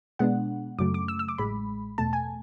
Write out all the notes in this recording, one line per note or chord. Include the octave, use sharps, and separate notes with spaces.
B2 G#3 B3 D4 F#5
F#2 C#3 F#3 A3 D6
D6
E6
E6
D6
A1 A2 G#3 B5
E2 B2 A3 A5
G#5